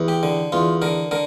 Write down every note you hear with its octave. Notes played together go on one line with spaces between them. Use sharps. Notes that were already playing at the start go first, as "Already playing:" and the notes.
Already playing: E2
G4
D3
E2 F4
D3 A#4
D3 A#4